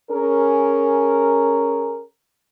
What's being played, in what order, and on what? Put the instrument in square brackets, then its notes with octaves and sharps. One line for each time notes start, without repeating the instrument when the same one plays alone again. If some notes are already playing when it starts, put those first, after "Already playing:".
[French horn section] C#4 G#4 A#4